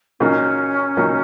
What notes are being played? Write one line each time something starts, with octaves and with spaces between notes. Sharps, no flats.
A#2 F#3 A#3 C#4 D#4
A#2 F#3 A#3 D#4